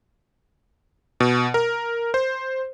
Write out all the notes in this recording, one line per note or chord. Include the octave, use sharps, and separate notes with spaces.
B2
A#4
C5